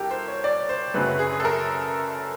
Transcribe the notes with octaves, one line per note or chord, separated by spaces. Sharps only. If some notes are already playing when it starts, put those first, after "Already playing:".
Already playing: C2 B2 G4 A4 A#4
C5
C#5
D5
C5
F#2 C#3 F#3 A3 B4
B4
G#4
G#4
A4
A#4